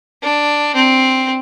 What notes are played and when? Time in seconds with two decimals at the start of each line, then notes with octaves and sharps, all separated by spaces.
0.23 D4
0.75 C4